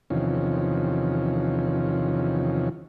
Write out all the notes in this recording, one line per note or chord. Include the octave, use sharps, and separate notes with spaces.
E2 C3 D#3 F3 C#4